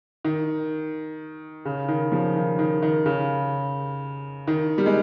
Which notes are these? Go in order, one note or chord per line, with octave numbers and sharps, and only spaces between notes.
D#3
C#3
D#3
C#3 F3
D#3
D#3
D#3
C#3
D#3
G3
G#3